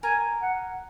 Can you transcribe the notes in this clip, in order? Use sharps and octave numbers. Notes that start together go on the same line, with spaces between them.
A#4 G#5
F#5